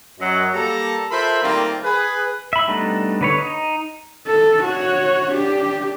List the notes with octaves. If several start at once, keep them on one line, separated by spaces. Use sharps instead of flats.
F#2 F#3 D#5
G3 A#3 G4 A4 A5 A#5
F4 A4 A#4 C5 E5 B5
D#3 G3 A3 A#3 C4 F4
G#4 B4
E5 B5
G3 A3 B3 D4 D#4
D3 B4 C#5
D#4
A4
F#4 C#5
D4 G4